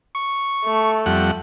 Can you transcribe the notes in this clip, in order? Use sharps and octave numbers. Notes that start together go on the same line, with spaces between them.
C#6
A3
F2 G3 F#5